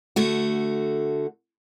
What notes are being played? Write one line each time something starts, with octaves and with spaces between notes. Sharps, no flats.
D3 A3 F#4